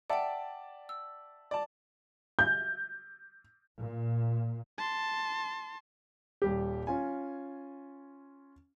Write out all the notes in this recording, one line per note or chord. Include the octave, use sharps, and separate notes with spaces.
D5 E5 F#5 G5 A5
E6
D5 A5
G6
A#2
A5 C6
D#1 G3 G4
C#4 F4 G#5